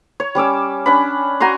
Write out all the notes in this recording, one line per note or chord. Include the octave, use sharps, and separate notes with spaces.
C#5
G3 C#4 D6 E6
C#4 D4 B5
F#4 G#5 A#5 C6